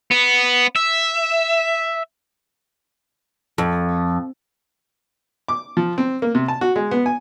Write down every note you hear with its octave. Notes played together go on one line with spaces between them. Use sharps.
B3
E5
F2
D6
F3
C4
A#3
C3
A5
F#4
G#3
B3
G#5